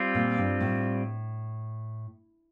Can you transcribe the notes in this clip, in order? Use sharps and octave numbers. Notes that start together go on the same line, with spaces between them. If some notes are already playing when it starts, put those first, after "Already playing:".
Already playing: G3 C4 F4
A#2
G2
A2